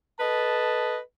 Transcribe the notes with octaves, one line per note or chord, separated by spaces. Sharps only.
A4 B4 D#5 A5